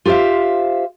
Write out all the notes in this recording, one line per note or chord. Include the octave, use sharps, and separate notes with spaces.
F4 G4 C5 E5 F5